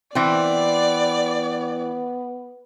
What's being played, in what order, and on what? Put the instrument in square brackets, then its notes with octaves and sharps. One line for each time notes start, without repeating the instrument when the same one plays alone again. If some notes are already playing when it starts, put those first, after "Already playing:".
[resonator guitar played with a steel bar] E3 C4 [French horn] B3 [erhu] D5